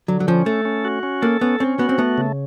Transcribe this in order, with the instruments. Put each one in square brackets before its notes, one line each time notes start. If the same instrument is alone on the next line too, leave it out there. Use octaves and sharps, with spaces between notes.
[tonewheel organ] D3 [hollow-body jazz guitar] F#3
[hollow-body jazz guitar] F#3
[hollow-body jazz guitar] F3 [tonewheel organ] C#4
[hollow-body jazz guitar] A3 [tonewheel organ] A4
[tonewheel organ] C#4
F#4
C#4
[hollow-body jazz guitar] A#3 [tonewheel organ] A4
[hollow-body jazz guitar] B3 [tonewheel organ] C#4
[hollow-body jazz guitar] C4 [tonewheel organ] C#4
[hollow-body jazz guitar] B3 [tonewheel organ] F#4
[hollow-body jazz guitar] C4
[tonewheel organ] A3 [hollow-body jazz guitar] B3
[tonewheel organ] C#3